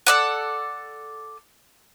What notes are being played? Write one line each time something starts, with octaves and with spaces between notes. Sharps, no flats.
A4 D5 F#5